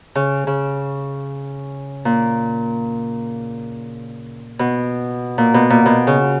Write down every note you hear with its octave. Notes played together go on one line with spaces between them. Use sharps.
C#3
C#3
A#2
B2
A#2
B2
A#2
B2
C#3